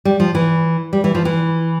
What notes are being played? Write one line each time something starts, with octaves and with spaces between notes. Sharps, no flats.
G3
F3
E3
G3
E3
F3
E3